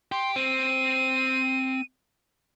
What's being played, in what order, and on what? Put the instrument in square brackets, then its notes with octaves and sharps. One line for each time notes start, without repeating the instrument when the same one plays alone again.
[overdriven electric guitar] G4 [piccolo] C6
[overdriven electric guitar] C4 [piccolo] D#7